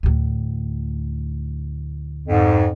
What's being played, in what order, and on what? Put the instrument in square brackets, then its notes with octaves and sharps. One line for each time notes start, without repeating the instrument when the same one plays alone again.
[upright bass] D2 A2
[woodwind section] F2 G#2